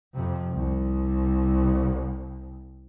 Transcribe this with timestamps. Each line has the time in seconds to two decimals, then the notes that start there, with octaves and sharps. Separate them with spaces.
0.14 F2 C3
0.52 C2